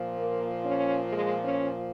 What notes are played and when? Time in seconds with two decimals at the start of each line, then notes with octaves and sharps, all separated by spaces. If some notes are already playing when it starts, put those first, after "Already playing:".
Already playing: A#2 F3
0.18 A#3
0.65 C#4
1.12 G#3
1.44 C#4